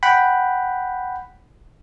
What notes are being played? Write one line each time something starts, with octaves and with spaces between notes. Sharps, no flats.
F#5 G5 B5